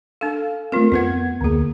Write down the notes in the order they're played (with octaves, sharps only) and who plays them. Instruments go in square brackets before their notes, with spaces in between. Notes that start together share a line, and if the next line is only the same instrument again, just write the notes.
[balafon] D4 A4 [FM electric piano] F5
[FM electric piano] A3 C4 [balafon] F4 A#4
[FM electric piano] F2 B3 G#6 [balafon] F4 B4 F#5
[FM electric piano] D2 A#3 [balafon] D3 G#4